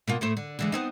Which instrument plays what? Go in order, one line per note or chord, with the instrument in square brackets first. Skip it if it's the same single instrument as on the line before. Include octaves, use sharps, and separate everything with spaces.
[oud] B2 A#3 F4
A2 A3 C5
D3
D3 E3 G#3
B3 C4 D#4